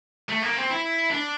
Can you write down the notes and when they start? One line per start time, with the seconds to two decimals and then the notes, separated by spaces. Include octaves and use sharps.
0.29 A3
0.42 A#3
0.56 C4
0.70 E4
1.11 D4